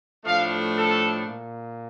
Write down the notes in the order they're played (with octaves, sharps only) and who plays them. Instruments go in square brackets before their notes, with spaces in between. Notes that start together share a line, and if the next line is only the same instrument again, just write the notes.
[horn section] A2 F3 A3 D4 F5
A4
A#2